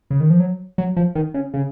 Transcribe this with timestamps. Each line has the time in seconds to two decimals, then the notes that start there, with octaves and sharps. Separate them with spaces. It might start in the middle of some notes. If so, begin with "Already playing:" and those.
0.10 C#3
0.20 D#3
0.30 F3
0.40 F#3
0.78 F#3
0.96 F3
1.15 D#3
1.34 C#3
1.54 C#3